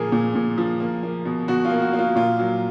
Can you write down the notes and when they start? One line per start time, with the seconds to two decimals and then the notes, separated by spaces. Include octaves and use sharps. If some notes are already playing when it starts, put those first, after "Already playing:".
Already playing: A#2 F3 A#3 G#4
0.12 A#2
0.35 A#2
0.58 F3
0.80 A#3
1.03 A#3
1.25 B2
1.48 B2 F#4
1.65 F4
1.70 A#3
1.82 F#4
1.93 A#3
1.99 F4
2.16 A#2 F4
2.39 F#3